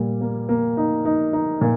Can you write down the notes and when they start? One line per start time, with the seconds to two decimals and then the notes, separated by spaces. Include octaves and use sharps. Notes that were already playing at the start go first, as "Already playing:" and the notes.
Already playing: A#2 G3
0.21 A#3
0.49 A#3
0.77 D#4
1.05 D#4
1.33 D#4
1.61 A#2